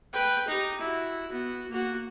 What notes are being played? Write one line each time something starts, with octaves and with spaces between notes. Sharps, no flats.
B4 G5
D#4 G4
E4 F#4
B3 F#4
A#3 F#4